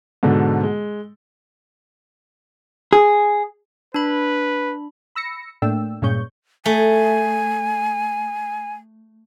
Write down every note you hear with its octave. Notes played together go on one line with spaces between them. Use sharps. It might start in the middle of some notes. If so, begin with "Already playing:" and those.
G#2 B2 D3 A4
G#3
G#4
D4 B4 B5
B5 E6 A#6 C#7
A2 A3 A#3 D4 G5 E6
G2 A#2 G#3 C#4 C#6 G6
A3 G#5